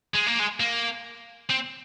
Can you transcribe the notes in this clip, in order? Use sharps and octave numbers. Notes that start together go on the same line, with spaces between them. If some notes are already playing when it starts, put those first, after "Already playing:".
G#3
A#3
G#3
A#3
C4